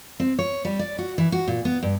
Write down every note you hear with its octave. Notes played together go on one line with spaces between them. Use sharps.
C4
C#5
G3
D5
F#4
E3
F#4
A#2
B3
G2